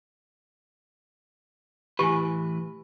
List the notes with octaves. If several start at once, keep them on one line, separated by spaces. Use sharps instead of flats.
A2 E3 G4 B4 G#5